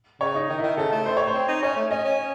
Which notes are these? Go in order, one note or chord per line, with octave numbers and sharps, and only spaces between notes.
C#3 C#5
D#4
D#3 D#4
D#3 E4
C#3 A4
A3
C5
C#5
C5
C4
D#4
C#4 C#5
A3
C#4 D#5
C#4